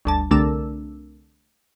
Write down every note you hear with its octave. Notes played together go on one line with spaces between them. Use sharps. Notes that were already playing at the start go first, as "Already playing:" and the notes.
G1 D2 A5
C2 D3 A3 D4 A#4 E6